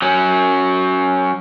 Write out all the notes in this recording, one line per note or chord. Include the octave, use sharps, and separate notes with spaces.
F#3 C#4